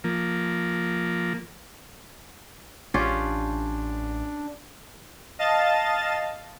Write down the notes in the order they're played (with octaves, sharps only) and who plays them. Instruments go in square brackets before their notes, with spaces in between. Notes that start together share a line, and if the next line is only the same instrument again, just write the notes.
[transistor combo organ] F3 A#3
[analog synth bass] A1 [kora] C#4 F4 G4 [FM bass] D4
[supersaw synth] D#5 F5 A5 A6